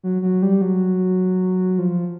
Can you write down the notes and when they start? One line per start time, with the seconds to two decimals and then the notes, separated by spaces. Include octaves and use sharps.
0.03 F#3
0.22 F#3
0.42 G3
0.61 F#3
1.79 F3